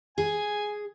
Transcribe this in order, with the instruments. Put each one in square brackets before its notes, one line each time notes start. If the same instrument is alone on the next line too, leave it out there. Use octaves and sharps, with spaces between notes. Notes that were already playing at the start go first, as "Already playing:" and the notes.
[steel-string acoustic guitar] G#4 [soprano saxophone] G#5